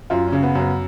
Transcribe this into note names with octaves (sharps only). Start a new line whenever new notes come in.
F#2 F4
C#3 C#4
B3
F#2
B3